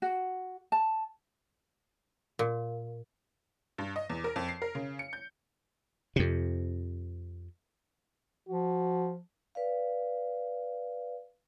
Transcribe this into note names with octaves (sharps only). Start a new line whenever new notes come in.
F#4
A5
A#2
G2
D#5
E2
A#4
F2
C7
A#4
C#3
C#7
G6
F2 C3
F3 F#4
B4 D5 F5